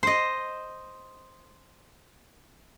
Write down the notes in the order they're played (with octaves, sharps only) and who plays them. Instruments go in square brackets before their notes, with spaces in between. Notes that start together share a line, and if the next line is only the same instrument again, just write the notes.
[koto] C5 D#5